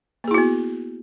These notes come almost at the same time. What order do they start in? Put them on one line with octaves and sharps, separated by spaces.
A#3 G#4 E4 F#4 B3